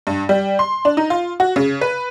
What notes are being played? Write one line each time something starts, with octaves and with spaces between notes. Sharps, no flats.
G2
G3
C6
D4
D#4
F4
F#4
C#3
B4